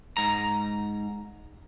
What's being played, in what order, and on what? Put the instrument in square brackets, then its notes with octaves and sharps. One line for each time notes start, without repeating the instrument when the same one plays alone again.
[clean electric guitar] G#2 A#5